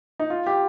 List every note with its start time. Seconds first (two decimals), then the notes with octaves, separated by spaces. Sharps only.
0.19 D#4
0.30 F4
0.46 G4